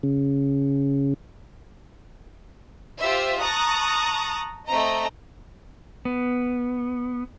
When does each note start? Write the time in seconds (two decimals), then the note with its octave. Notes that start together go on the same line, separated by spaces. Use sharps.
0.03 C#3
3.00 F4 G4 C5 E5
3.40 A5 A#5 C#6 D#6 F#6 A6
4.67 A3 C4 D#5 A#5
6.05 B3